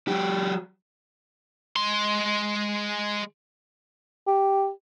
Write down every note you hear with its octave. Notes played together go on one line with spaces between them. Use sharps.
F#3 G4
G#3 C6
G4